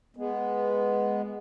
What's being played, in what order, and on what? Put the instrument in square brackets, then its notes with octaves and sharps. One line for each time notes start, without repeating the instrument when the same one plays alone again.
[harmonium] G#3 B3